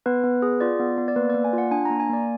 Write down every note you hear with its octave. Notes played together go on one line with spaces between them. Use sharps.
B3 B4
B3
G#4
F4 D5
B3
B3
D5
A#3 B4
A#3 D5
G#5
F4 F#5
D4 G#5
A#3 A#5
G#5
A#3 D5